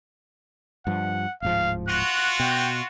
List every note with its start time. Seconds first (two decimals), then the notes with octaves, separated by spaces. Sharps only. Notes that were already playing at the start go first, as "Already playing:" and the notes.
0.87 G2 F3 F#5
1.42 D1 G#2 F3 F5
1.88 F4 F#4 F#6
2.40 B2 G5